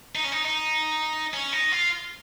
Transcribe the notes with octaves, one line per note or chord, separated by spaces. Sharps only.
D#4
C#4
D#4
D#4
C#4
D#4
F4